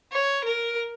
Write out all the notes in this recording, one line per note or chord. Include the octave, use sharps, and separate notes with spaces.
C#5
A#4